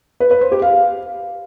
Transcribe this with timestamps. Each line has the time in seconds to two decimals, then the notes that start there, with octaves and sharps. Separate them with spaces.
0.20 B4
0.31 B4
0.41 C5
0.52 G4
0.62 F5